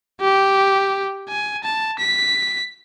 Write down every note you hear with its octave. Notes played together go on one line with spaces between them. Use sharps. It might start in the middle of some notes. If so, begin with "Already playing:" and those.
G4
G#5
A5
B6